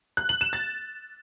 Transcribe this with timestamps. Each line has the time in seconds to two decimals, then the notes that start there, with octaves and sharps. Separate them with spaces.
0.17 F#6
0.29 F#7
0.41 E7
0.53 A6